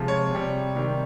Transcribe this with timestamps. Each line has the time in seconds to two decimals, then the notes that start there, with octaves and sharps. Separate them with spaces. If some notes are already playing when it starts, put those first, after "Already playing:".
Already playing: C3 F3 G#3
0.08 C#5
0.31 C3 G3
0.75 C3 D#3 G3